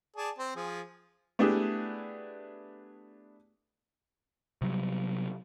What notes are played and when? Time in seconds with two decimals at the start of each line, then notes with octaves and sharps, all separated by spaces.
0.16 G#4 D5 A5
0.39 C4 C5
0.56 F3 G#4
1.39 A3 B3 D4 E4 G4 G#4
4.62 C3 F#3 G3